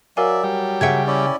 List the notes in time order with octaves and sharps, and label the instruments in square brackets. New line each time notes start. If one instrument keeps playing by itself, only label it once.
[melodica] F#3 D5 E5 [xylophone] A#4 F5 G#5
[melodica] F#3 [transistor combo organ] G3
[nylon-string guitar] C#3 E5 G5 [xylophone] F#5 G#6
[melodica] C#4 E4 D5